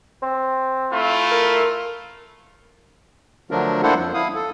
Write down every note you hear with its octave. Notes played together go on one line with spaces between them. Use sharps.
C4
A3 E4 F4
A#4
D3 F3 F#3 A3 D4 A#4
A#3 D4 E4 A4 C5 F#5
F2 F3
E4 F5 D#6
A4